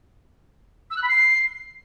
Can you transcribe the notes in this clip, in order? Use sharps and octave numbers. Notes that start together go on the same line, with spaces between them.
E6
F#6
B5
C7